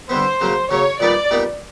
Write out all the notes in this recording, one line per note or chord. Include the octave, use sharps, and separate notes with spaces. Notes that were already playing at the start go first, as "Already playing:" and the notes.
D3 G3 B3 C5
C#3 F#3 A#3
C#3 F#3 A#3 C#5
A#2 G3 B3 D#4 D5
A#2 G3 B3 D#4